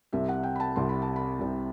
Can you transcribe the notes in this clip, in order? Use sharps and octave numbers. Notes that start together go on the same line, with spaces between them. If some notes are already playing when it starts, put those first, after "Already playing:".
C2 C3 G3 E5
F#5
G5
B5
A5
C2 C3 G3 C6
B5
A5
B5
C2 C3 G3